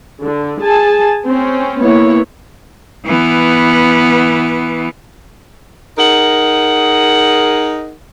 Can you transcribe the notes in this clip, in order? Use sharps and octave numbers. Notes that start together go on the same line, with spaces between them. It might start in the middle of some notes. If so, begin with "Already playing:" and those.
D3
G#4 G#5 A5
C4 C#4
A#3 B3 E4 C#5
E3 B3
D#4 G#4 A#4 F#5